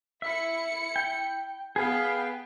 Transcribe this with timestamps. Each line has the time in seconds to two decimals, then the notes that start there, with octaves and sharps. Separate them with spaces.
0.22 E4 E5 C#7
0.96 G5
1.76 B3 G#4 B4 F5 G5